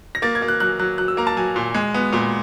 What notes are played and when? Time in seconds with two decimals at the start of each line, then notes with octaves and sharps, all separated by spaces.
0.15 A#6
0.22 A#3 A6
0.35 G#6
0.42 A#3
0.48 F#6
0.60 F#3 F#6
0.79 F#3 F#6
0.98 F#3 F#6
1.08 E6
1.17 A#3 A#5
1.27 A5
1.37 F#3 G#5
1.56 A#2
1.74 G#3
1.94 B3
2.13 A#2